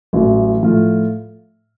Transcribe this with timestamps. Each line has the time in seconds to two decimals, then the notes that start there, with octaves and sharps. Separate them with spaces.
0.13 A1 A2 F#3
0.63 A2 F3 A3 F4